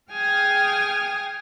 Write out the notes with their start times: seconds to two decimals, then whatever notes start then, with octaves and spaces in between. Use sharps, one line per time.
0.12 G#4 F5 G5 G#5 D#6 F6